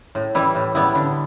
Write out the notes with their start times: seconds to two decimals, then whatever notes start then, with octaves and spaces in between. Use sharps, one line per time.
0.15 A2
0.35 E3 G3 E4
0.55 A2
0.75 G3 B3 E4
0.95 D3